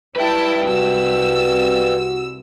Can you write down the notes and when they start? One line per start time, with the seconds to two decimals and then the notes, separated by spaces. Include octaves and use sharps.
0.16 E4 G4 B4 G5 A5
0.66 C2 F#4 E6